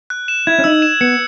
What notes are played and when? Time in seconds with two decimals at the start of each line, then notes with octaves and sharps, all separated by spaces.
0.10 F#6
0.28 E7
0.47 E4 G#6
0.59 C#4
0.64 D#4 E6
0.82 E7
1.01 B3 C#7